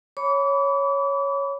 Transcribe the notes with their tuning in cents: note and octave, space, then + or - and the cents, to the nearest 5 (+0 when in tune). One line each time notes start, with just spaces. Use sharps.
C#5 +0 B5 +0 D6 -40